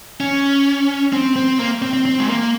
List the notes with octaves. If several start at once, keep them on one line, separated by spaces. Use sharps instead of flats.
C#4
C4
C4
A#3
C4
C4
C4
G#3
A#3